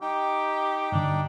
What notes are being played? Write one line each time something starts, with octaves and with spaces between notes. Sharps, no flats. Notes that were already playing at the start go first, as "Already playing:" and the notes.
D#4 G4 G5
G2 D3 D4